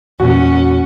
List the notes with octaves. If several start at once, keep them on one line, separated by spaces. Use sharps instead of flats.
E2 A#2 C#4 F#4